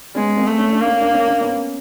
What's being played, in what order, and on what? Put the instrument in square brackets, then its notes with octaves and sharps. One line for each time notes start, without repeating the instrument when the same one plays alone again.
[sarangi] G#3 [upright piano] B3 C#4
[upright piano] A#3 C4
[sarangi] A3
[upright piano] C#4
D4
[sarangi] A#3
[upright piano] C#4
D4
C#4
D4
B3 C#4